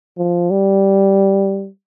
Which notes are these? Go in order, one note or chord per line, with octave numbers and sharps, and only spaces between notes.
F3
G3